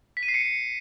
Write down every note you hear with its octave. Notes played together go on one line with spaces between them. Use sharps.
B6
D#7
C7
C#7